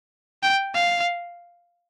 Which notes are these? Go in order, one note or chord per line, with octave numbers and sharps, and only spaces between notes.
G5
F5